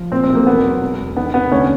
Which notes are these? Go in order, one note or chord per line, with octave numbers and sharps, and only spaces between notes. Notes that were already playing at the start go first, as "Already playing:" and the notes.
Already playing: F3
A#2 C4
C4
B1
A#3
E2 B3
F#3
E1
E1
D#3 B3
C3 B3
D2 C#4